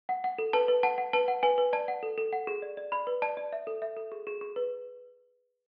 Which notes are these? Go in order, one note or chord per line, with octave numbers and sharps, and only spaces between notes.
F#5
F#5
A4
B4 A5
B4
F#5 A5
F#5
B4 A5
F#5
B4 G#5
B4
D5 A5
F#5
A4
A4
F#5
G#4
D5
D5
D5 B5
B4
D5 A5
D5
E5
A4
E5
A4
G#4
G#4
G#4
B4